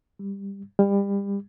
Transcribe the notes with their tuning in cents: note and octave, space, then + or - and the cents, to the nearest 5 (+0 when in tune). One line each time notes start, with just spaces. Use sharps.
G3 +15
G3 +30